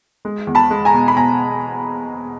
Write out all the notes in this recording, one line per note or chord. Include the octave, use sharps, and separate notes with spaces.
G#3
E2
A5 B5
G#3
G#5 A#5
B2
B5
B2 G#5 A#5